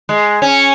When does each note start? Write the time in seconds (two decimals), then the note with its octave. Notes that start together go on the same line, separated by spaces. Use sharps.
0.09 G#3
0.42 C#4